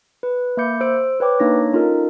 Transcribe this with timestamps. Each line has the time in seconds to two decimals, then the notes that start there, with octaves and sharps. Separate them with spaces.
0.23 B4
0.57 A#3 E5 B5 D6 G6 C#7
0.81 C5 E6 D7
1.20 B4 C#5 G5 D6
1.40 A#3 D4 D#4 C#5 A#6
1.72 C#4 D#4 F4 A4 A#4 D#5